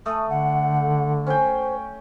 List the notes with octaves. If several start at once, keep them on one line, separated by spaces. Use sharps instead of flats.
A3 D#6
D3 F#5
C#4 C5 G5